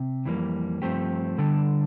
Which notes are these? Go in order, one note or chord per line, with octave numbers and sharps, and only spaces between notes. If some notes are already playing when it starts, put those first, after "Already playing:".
Already playing: C3
F2 E3 G3 A#3
G2 F3 A3 C4 G4
D3 G3 D4 A4